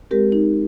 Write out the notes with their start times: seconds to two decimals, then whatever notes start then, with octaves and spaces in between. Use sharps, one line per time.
0.11 G#3 C4 G4 A#4
0.32 D#4